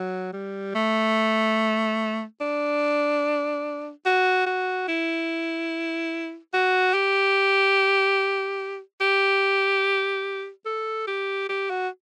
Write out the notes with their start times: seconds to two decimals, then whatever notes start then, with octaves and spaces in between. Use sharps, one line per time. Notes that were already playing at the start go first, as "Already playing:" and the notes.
Already playing: F#3
0.33 G3
0.75 A3
2.41 D4
4.06 F#4
4.46 F#4
4.88 E4
6.54 F#4
6.94 G4
9.01 G4
10.66 A4
11.07 G4
11.49 G4
11.70 F#4